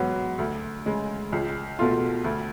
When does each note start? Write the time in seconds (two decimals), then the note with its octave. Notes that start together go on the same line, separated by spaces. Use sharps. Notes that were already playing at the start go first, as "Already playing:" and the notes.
Already playing: G#2 F#3 B3 F#4
0.38 D2
0.86 C#3 G#3
1.32 C#2
1.79 B2 A3 F4
2.24 D2